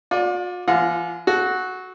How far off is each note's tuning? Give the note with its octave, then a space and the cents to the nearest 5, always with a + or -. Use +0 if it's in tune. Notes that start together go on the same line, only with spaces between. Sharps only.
F4 +45 D5 +0
E3 +45 F4 -15 F#5 -35
F#4 +0 A4 -35